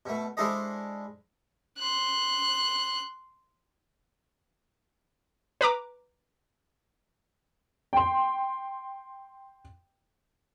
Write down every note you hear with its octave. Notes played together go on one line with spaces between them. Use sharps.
B2 A3
G#3 D4 E4 A4 C5 D#5
C6 F#6
B4 A#5 D6
G5 C6